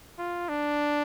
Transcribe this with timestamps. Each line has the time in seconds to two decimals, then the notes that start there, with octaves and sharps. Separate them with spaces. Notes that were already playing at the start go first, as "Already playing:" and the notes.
0.18 F4
0.49 D4